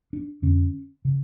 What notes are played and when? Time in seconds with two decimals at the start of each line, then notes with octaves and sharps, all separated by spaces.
0.13 D4
0.42 F2 D3 C#4
1.05 C#3